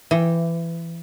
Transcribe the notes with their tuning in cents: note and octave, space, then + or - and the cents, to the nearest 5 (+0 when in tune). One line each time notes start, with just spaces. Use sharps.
E3 +20 G5 +0